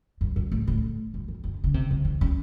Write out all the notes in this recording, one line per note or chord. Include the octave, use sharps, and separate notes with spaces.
F#2
F#2
A2
A2
F#2
F2
F#2
C#3
C3
C#3
D#3
C#4